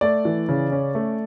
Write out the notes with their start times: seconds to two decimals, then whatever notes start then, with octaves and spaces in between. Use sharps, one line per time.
0.01 A3 D5
0.25 E3
0.49 C#3
0.72 C#4
0.95 A3